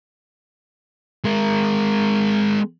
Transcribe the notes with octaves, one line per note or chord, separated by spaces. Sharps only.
G#3 A#4